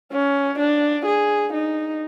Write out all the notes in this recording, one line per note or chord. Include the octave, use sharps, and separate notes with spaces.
C#4
D4
G#4
D#4